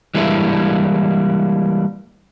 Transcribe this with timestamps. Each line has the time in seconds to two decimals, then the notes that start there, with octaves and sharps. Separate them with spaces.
0.15 E3 G3 G#3 A#3 D4 E4